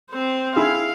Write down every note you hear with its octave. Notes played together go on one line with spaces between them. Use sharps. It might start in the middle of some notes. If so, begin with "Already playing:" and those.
C4 C5
E4 G#4 F5